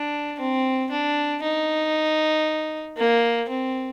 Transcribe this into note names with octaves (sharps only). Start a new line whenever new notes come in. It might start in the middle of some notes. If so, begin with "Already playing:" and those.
Already playing: D4
C4
D4
D#4
A#3
C4